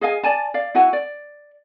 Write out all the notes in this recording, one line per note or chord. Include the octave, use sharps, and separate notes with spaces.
G#4 D#5 F5 G#5
D5 G#5 A5
D5 F5
E4 F#4 F#5 G#5
D5